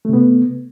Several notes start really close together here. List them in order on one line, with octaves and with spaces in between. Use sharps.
A3 C3 B3